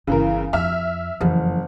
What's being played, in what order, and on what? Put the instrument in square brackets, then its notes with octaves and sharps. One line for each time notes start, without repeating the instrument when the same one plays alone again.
[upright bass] G1 [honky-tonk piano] C#3 E3 A#4
[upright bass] F2 [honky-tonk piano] E5 F6
[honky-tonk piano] F#1 [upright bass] F2 E3